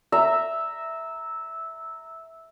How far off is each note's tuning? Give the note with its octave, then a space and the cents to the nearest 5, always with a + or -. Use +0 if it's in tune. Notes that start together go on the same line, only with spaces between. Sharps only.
E5 -10 A#5 -10